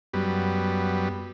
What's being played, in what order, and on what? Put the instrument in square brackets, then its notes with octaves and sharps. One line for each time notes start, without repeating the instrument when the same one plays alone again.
[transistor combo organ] F#2 G3 B3